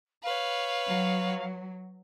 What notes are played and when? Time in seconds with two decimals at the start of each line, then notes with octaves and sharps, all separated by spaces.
0.23 B4 C#5 F5
0.88 F#3